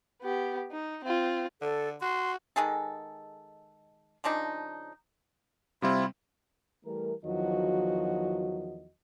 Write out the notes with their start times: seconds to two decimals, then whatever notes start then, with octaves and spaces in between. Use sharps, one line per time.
0.22 B3 G4
0.72 D#4
1.04 C4 F4
1.62 D3 A4
2.01 F#4 C6
2.56 D#3 G#3 G#4 A4
4.24 C#3 F3 D4 D#4
5.82 C3 G3 C4 E4 F4
6.84 E3 G3 A3 A#4
7.24 E2 D#3 F3 F#3 F#4 D#5